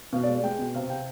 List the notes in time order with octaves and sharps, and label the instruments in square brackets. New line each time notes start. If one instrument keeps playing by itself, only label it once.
[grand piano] B2 F5
D5
G#3
G#3 G5
B2
C3 F5
C3 G5